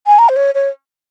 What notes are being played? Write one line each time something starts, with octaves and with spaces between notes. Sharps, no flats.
G#5
A#5
C5
C#5
C#5